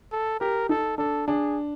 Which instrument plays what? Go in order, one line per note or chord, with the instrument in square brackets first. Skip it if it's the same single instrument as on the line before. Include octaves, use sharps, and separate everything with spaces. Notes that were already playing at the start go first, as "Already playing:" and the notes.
[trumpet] A4
[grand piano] G4 [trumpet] A#4
[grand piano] D#4 [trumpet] A4
[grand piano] D4 [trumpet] A4
[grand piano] D4 [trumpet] G#4